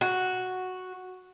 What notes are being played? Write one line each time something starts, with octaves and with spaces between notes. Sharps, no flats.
F#4